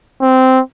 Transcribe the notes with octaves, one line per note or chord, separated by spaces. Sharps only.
C4